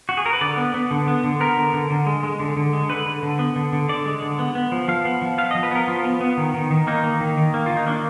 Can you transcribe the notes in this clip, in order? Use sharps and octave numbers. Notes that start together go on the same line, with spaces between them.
F#4
G#4
A#4
B4
D3 D5
B3
B3
D3
B3
D3
B3 A#4
D3
D3
D3
G#3
G#3
D3
D3
G#3
D3 B4
D3
D3
B3
D3
D3
D3 D5
G#3
D3
B3
B3
F3
F3 F5
B3
F3
B3 F5
D#5
F3
B4
B3 A#4
F3 F4
B3
B3
D#3
D#3
D#3
A#3 D#4
A#3
D#3
D#3
A#3
D#3 F4
D#4
A#3 D4